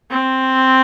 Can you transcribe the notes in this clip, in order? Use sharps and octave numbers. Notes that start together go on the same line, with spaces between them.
C4